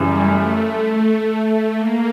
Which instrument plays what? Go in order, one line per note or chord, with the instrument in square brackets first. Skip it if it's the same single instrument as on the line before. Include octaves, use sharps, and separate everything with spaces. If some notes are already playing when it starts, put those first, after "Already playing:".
Already playing: [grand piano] F#2 C#3 E3 [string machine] G3
[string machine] A3
A3
A#3